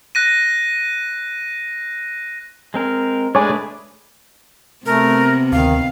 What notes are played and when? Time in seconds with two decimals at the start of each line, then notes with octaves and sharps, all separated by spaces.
0.15 F#6 A#6 D#7
2.74 G#3 C4 A#4
3.35 G#3 A3 D4 G#4 B4 C#5 G#5
4.86 C3 A3 B3 A#4
5.52 D2 D#3 F5